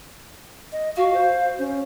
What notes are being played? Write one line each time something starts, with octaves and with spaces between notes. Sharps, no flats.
D#5
F#4 F5
C5
C#4